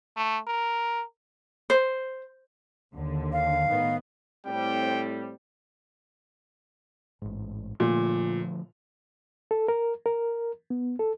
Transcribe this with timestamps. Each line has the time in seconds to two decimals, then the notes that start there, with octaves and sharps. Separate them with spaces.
0.16 A3
0.47 A#4
1.70 C5
2.93 D#2 D3
3.33 F5
3.68 A2 D#3 B3
4.46 A2 G3 C4 G5
7.22 A1 G#2
7.80 A#2 D3 F3 A3
9.51 A4
9.68 A#4
10.06 A#4
10.70 B3
10.99 A4